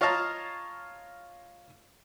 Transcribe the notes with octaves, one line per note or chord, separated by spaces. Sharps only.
F4 C#5 D#5 F5 A5 A#5